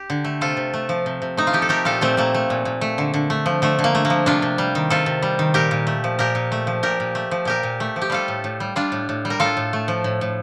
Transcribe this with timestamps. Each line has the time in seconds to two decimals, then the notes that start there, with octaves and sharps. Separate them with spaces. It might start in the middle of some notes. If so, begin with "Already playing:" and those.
Already playing: G4
0.10 D3
0.24 A3
0.41 C3 F4 A4
0.57 C3
0.74 A3
0.89 F3
1.06 C3
1.22 C3
1.37 A3 D#4
1.47 F4
1.53 F3 G4
1.62 A4
1.69 A3 G4 A#4
1.85 A#2 F4 A4
2.01 A#2 A3 C4
2.17 A3 A#3
2.34 A3
2.50 A#2
2.65 A#2
2.81 A3
2.98 D3
3.14 D3
3.30 A3
3.46 F3
3.62 D3 A3
3.79 D3
3.84 A#3
3.95 A3
4.05 A#3
4.10 F3
4.26 C3 D4 F4
4.42 C3
4.58 G3
4.75 D#3
4.90 C3 F4 A4
5.06 C3
5.22 G3
5.39 D#3
5.54 A#2 G4 A#4
5.71 A#2
5.87 A3
6.04 F3
6.19 A#2 G4 A#4
6.35 A#2
6.52 A3
6.67 F3
6.83 A#2 G4 A#4
7.00 A#2
7.15 A3
7.31 F3
7.45 A#2 G4 A#4
7.63 A#2
7.80 A3
7.96 F3
8.01 G4
8.10 G3 F4 A4
8.28 A2
8.44 A2
8.60 G3
8.76 G3 D4 F4
8.92 A2
9.09 A2
9.25 G3
9.30 A#4
9.40 A2 F4 A4
9.57 A2
9.73 A3
9.88 F3
10.04 A2
10.21 A2